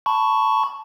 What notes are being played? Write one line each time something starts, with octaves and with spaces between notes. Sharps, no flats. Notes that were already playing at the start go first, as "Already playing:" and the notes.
A5 B5 C#6